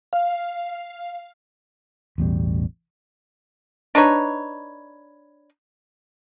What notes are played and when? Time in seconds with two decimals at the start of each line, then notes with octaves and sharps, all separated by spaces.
0.13 F5
2.18 A1 E2 B2 G3
3.95 D4 D#4 B4 C#5